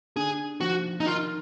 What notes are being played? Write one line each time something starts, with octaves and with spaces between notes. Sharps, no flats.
D3 G#4
F3 F#4
D#4
D#3 F4